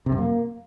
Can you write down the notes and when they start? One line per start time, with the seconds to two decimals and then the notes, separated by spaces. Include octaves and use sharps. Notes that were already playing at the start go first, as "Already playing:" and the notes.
0.06 C3
0.12 F#2
0.18 A#3